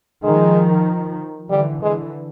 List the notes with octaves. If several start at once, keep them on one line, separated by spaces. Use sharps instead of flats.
D#3 F3 G#3
D3 E3 G3
D3 E3 G#3